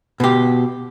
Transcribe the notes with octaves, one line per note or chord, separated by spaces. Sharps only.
B2 G4